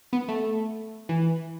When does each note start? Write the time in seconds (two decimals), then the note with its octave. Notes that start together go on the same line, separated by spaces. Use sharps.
0.13 B3
0.28 A3
1.09 E3